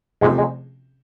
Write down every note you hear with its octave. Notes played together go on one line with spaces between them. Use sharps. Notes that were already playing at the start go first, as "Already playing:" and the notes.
G#2 C3 F3 G#3 A3 C4
G#3